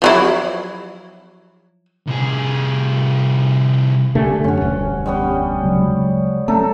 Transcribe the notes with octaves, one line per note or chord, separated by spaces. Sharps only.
F3 F#3 E4
C2 G#4
D3 A3 G4 G#5
F#2 C#4 F#4
E1 D2 G2
G3 B3 C#4
C#3 F#3 G#3
A3 C#4 A4 A#5